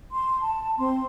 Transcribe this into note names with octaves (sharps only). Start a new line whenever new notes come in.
C6
A5
C4 C6